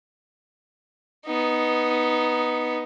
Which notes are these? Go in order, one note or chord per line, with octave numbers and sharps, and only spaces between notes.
B3 D#4